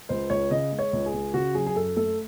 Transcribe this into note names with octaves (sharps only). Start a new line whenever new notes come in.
C#2 C5
C#2 C#5
C#3 D#5
G#3
C#5
C#2
G#4
C#2
C#3 F#4
F#3 G#4
G#4
F#2 A4
A3 A4